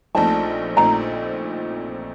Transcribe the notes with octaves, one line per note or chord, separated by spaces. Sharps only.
A#1 A#2 A3 C4 D#4 A5
A#1 A#2 A3 C4 D#4 A#5